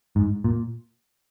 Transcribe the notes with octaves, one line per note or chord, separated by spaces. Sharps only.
G#2
A#2